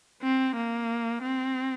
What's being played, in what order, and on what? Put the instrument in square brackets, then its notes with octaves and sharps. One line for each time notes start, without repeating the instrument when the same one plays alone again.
[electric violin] C4
A#3
C4